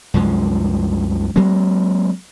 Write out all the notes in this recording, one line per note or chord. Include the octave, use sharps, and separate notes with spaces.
C2 F#2 F3 G#3
F#3 G#3 A#3 C4